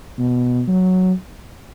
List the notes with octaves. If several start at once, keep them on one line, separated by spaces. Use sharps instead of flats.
B2
F#3